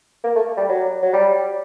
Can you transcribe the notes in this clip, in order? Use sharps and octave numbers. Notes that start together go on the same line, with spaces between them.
A#3
A3
G3
F#3
F#3
G3